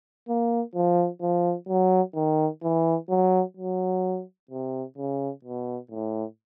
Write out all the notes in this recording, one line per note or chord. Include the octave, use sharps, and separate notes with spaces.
A#3
F3
F3
F#3
D#3
E3
F#3
F#3
C3
C#3
B2
A2